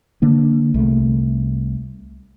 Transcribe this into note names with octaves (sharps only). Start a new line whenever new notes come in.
D3 A#3 D4
C2 A3